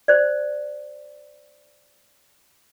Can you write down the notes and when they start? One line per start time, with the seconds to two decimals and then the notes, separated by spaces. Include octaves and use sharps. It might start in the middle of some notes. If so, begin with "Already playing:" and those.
0.08 C5 D5